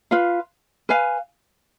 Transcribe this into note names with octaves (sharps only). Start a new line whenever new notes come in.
F4 B4 F5
B4 F5 G#5